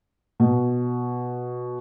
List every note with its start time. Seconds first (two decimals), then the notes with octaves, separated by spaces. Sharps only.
0.40 B2